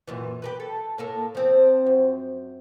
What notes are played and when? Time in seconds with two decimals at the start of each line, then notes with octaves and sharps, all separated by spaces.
0.07 F#2 A#2 E3
0.42 G4 A#4 B4
0.60 A4
0.98 A2 A#3 A4
1.35 F3 C4
1.86 F#2